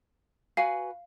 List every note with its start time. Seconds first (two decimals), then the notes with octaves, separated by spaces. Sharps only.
0.57 F#4 B4 F5 G#5